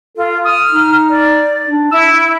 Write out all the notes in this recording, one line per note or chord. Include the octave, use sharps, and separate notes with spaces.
F4 A4
D#6 F6
D#4
D5
D4
E4 E6